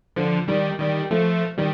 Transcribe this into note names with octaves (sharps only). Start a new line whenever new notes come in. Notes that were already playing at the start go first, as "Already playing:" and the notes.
D3 F3
D#3 G3
D#3 G3
F3 A3
D#3 G3